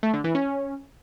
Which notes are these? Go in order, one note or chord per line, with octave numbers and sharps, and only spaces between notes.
A3
D3
E3
C#4